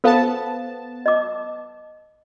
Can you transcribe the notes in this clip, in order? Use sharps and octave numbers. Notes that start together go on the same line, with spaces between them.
B3 A4 C5 F5 A5
D#5 D6